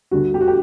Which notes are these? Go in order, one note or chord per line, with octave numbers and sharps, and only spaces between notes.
D2 D3 G3 F#4
G4
F#4
G4